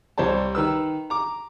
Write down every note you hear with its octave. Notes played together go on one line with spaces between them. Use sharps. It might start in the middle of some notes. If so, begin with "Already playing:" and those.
C2 G3 C5 C#5 A5
D#3 B4 E6
A#5 D6